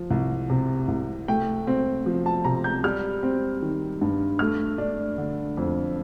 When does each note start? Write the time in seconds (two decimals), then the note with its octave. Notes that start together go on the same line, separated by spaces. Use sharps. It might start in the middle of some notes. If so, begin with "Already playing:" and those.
Already playing: F3
0.11 C2
0.50 C3
0.88 C2
1.28 A3 G5
1.67 C4
2.06 F3
2.26 A5
2.45 C3 A#5
2.64 G6
2.84 G3 F6
3.23 C4
3.62 D#3
4.01 G2
4.39 A3 F6
4.78 D4
5.18 D3
5.57 F2